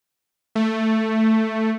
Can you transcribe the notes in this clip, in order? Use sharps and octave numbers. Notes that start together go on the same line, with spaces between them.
A3